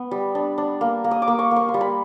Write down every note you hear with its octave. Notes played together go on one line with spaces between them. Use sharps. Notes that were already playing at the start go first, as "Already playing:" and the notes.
Already playing: B3
G3
D4
D4
A#3
A#3
D#6
D6
A#3
C#6
A#3
C#6
C6
G3
B5